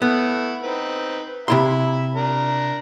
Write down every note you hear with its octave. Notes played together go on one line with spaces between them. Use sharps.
A3 B3 E4
C4 D#4 B4
C3 E4 E5 B5 C6
D4 A#4 A#5